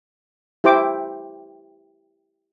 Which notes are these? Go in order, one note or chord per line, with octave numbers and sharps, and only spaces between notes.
E4 G4 C5 G5 D6